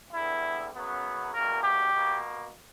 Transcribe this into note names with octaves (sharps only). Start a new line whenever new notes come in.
E2 D3 G3 B3 E4
F#2 C#3 F#3 B3
E2 B2 G3 A#3 A#4
G4
B2 A#3